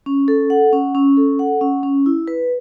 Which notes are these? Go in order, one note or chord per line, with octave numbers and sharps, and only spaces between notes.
C#4
A4
F#5
C#4
C#4
A4
F#5
C#4
C#4
E4
B4